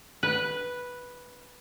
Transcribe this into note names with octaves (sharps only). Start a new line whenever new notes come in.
B4